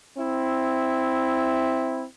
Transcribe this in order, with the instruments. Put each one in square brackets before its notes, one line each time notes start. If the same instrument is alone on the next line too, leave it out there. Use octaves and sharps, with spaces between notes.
[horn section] C4 E4